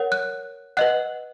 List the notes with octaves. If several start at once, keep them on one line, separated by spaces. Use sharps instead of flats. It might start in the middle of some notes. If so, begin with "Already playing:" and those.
Already playing: A#4 C#5 F#5
F#6
B4 D#5 F#5 F#6